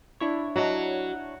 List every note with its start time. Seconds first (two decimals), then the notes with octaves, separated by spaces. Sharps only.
0.20 D4 E4 C#5
0.56 F#3 F#4 D#5 A5